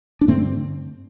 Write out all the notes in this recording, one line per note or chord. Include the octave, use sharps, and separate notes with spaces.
D4
G2 D3 A3 C4